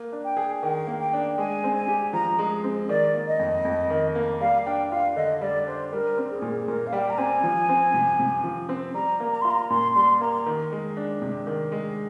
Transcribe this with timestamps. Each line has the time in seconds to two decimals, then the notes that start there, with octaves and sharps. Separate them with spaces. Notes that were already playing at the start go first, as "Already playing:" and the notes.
Already playing: A#3
0.12 D4
0.25 G5
0.37 G#4
0.63 D#3 G5
0.87 A#3
1.00 G5
1.13 D4
1.38 G#3 G#5
1.64 C4
1.76 G#5
1.88 G4
2.13 F3 A#5
2.39 G#3
2.64 C4
2.89 D#3 D5
3.14 A#3
3.28 D#5
3.39 F2
3.65 F2
3.90 D#3
4.15 A#3
4.41 G3 F5
4.66 D4 G5
4.91 F4 F5
5.16 D3 D#5
5.41 G3 D5
5.67 D4 C5
5.92 G3 A#4
6.17 C4
6.30 G#4
6.42 A#2
6.68 A#2 A#4
6.87 F5
6.93 G3 G5
7.10 A#5
7.18 C4 G#5
7.44 F3
7.69 C4
7.94 C3
8.20 C3
8.44 F3
8.69 C4
8.94 G3 A#5
9.20 A#3
9.32 A#5
9.42 F4 C6
9.50 A#5
9.70 A#2 C6
9.95 G3 C6
10.21 A#3 A#5
10.46 D#3
10.72 G#3
10.97 D4
11.22 C3
11.47 D#3
11.72 G#3